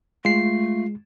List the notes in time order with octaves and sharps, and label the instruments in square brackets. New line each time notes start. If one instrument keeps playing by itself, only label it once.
[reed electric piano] G#3 [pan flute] A3 [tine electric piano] F4 C7